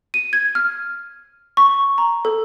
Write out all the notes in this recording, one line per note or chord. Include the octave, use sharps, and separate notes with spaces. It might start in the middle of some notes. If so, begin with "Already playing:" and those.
D#7
G#6
F6
C#6
A#5
A4